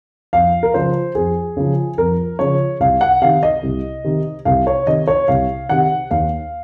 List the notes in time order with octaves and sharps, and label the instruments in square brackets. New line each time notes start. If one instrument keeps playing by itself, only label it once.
[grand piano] F2 F5
A#4
C#3 F3 C5
F2 G#4
C#3 F3
F2 A#4
C#3 F3 C#5
C2 F5
F#5
C3 D#3 F5
D#5
C2
C3 D#3
C2 F5
C#5
C3 D#3 D#5
C#5
C2 F5
C3 D#3 F#5
D#2 F5